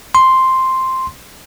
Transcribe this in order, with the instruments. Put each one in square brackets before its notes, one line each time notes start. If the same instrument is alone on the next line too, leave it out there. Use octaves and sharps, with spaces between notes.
[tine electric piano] C6